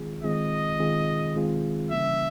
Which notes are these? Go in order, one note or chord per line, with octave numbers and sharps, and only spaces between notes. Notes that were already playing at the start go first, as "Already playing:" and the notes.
Already playing: D#3 G#3 C4 F4 G#4
D#3 G#3 C4 F4 G#4 D#5
D#3 G#3 C4 F4 G#4
D#3 G#3 C4 F4 G#4
C#3 E3 G3 A#3 C#4 E5